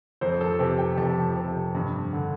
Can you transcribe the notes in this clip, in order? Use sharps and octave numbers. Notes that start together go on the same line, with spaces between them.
F2 C5
A4
C3 G4
G5
F2 A5
C3
G2
D3